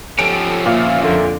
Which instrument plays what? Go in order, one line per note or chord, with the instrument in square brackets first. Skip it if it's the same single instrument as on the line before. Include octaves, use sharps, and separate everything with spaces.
[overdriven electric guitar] F3 C#4 [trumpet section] G4 A4 [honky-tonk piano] D7
[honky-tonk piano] A#2 [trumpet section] E5 F5
[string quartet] F2 D3 [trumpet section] F4 A#4 E5